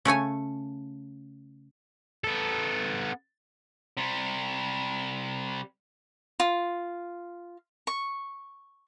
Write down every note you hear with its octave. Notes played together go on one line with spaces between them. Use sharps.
C#3 A3 C#5 G#5
B3 A4
C3 G3
F4
C#6